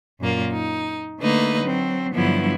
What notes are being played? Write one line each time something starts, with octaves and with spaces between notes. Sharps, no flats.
F#2 A#2 A#3 F4
D#4
D3 A3 A#3 D#4 B4
F#3 C4
G2 D3 F3 F#3 B3 E4